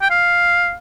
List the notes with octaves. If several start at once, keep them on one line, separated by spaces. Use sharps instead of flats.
G5
F5